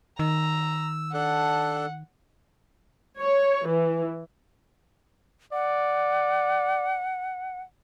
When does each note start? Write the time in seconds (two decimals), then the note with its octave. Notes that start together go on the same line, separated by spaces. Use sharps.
0.19 D#3 A#5 E6
1.14 D4 A4 F#5 F#6
3.20 C#5
3.66 E3
5.53 D5 F#5